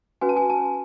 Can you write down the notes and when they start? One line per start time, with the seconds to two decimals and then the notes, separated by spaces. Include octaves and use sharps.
0.21 C#4 F#4 B4 G#5
0.29 A5
0.37 G#5
0.50 A5